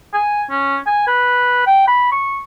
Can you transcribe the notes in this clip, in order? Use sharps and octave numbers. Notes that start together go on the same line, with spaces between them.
G#5
C#4
G#5
B4
G5
B5
C#6